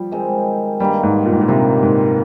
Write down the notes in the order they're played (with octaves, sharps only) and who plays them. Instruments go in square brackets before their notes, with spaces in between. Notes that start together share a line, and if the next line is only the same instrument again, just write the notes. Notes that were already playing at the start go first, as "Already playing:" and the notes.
Already playing: [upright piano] F3 G3
[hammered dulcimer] D#3 G#3 C4
[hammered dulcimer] G2 D#3 A#3 [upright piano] G3
[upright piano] G#2
A#2
G#2
A#2
[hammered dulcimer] G2 D#3 A#3 [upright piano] C3
[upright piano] G#2